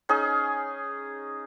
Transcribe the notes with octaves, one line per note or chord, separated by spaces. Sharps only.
C#4 D#4 G#4